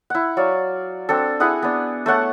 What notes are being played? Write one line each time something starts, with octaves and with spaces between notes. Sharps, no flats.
E4 F#5
F#3 C#5 D5 F5
C4 D4 A4
E4 G#4 F#5 D#6
B3 D4
A3 C#5 F#5 A5